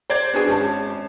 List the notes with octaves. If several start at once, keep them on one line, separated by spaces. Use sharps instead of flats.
C5 D5 G6 G#6
B3 D4 F#4 G#4
G#1 C#4 A5